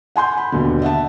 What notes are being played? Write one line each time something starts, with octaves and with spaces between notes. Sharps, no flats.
F#5 G#5 C6 G6
B5
D#2 B2 D3
D#5 E5 F#5 A5